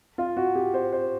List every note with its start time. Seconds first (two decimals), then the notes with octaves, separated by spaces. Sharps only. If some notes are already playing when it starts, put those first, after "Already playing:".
0.18 F4
0.37 F#4
0.55 G4
0.74 C5
0.92 C5